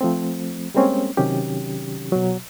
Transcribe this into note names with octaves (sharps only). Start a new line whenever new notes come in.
F3 A3 C4
G3 G#3 A#3 C4 C#4 C#5
C3 D#3 F#3 C#4 G4
B2 F#3